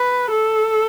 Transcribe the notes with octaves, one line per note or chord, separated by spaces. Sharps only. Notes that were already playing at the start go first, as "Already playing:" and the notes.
Already playing: B4
A4